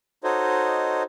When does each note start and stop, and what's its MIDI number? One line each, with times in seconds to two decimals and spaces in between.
0.24 1.03 63
0.24 1.03 66
0.24 1.03 69
0.24 1.03 72
0.24 1.03 73
0.24 1.03 75